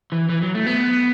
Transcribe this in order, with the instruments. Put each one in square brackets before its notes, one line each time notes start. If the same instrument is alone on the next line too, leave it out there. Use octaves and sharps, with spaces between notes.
[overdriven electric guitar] E3
E3
F#3
A3
B3